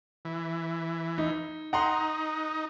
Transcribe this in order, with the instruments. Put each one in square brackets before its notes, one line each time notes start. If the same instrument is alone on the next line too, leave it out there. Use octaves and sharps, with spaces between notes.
[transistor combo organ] E3
[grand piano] D#4
[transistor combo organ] D#4 [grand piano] F#5 A#5 C6